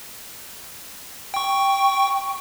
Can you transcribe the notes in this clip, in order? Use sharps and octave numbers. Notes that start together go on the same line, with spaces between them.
G5 C#6